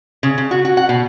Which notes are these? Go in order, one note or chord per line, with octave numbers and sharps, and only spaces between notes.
C#3
C#3
F#4
F#4
F#5
B2